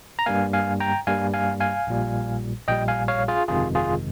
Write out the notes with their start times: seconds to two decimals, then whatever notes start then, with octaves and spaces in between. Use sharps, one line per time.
0.19 A#5
0.26 G2 G3 A#3 F5 G#5
0.53 F5 G#5
0.80 G5 A#5
1.07 G2 G3 A#3 F5 G#5
1.33 F5 G#5
1.60 F5 G#5
1.87 A#1 A#2 G3
2.68 A#1 A#2 G3 D#5 G5
2.88 F5 G#5
3.08 C#5 F5
3.28 F4 G#4
3.48 G1 F2 C3 D#3 G#3 F4 G#4
3.75 F4 G#4